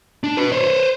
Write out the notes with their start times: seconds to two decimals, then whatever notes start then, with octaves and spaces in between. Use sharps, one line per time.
0.24 D4
0.37 F#4 B4
0.52 C5 C#5